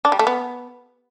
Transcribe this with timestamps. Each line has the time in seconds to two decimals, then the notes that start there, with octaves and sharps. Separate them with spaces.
0.05 D4
0.12 G3
0.19 A3
0.27 B3